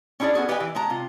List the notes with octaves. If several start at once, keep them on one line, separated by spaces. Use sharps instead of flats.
C#4 D4 E4 G#4 D5
B3 F#4 G#4 A4
G4 B4 D#5 F5 G5 G#5
E3
G#3 A5 A#5
C3 F4